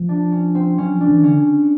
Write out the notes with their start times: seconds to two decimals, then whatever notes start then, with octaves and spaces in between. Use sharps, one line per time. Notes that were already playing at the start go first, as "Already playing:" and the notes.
Already playing: F3
0.09 D4
0.32 C#4
0.55 C4
0.78 F#3 C#4
0.94 F3
1.01 D4
1.09 E3
1.23 D3 C#4